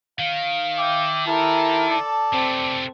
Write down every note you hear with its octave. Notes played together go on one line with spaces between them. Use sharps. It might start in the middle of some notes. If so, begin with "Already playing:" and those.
D#3 F5
E5 G5 D6
E4 G4 A4 A#4
D5 A5
C3 A3 C4